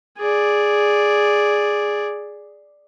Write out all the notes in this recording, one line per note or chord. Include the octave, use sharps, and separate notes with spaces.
G#4 D5